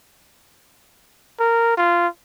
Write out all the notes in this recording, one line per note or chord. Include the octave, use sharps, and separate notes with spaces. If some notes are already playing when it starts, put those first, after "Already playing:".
A#4
F4